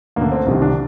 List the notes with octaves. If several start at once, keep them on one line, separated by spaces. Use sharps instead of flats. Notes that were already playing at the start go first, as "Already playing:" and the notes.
D2 D3 A#3
C4
C2 C3 D#3
D4